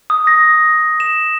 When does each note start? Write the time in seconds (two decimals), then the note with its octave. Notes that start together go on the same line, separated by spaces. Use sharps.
0.10 D#6
0.27 A#6
1.00 E7